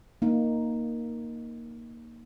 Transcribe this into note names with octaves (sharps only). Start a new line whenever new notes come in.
A#3 D#4